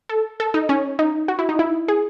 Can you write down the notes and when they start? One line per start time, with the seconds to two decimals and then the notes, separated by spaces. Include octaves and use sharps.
0.09 A4
0.40 A4
0.54 D#4
0.69 C#4
0.99 D#4
1.28 F#4
1.39 E4
1.49 D#4
1.59 E4
1.88 G#4